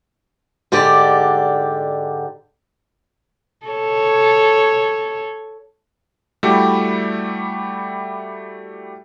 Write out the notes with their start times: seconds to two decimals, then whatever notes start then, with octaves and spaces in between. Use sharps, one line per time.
0.72 G#2 D3 G4 D5
3.66 A4 C#5
6.43 G3 A3 E4 F#4 G4